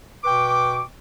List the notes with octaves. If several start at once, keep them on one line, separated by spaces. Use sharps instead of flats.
B2 B4 G5 C#6 D6